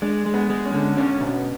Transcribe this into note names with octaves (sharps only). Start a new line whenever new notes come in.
G#3 D4
G#3
B3
G#3
C#4
D3
C#4 D4
B2